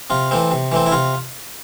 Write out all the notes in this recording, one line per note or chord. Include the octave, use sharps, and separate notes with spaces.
C3 F4
E3 A3 C4
C3
E3 A3 C4
E4
C3 F4